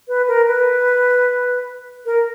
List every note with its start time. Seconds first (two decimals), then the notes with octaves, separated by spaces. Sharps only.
0.08 B4
0.28 A#4
0.47 B4
2.06 A#4